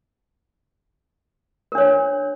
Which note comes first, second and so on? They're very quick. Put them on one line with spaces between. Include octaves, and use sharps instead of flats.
A#4 D4 C#5